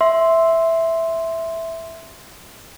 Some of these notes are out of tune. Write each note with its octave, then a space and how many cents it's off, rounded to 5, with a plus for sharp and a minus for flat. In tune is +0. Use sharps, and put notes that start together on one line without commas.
E5 +0 C6 +0